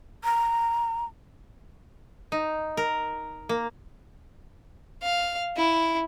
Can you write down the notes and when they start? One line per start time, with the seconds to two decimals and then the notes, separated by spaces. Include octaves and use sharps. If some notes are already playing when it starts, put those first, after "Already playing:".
0.24 A#5
2.32 D#4
2.77 A#4
3.49 A#3
5.03 F5
5.57 E4